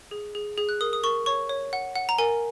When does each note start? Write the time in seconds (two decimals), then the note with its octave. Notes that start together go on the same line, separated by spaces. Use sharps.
0.11 G#4
0.35 G#4
0.58 G#4
0.69 F#6
0.81 A#4 D#6
0.93 D#6
1.03 A#4 C#6
1.26 C#5 C#6
1.49 C#5
1.73 F#5
1.95 F#5
2.09 A#5
2.18 A#4 G#5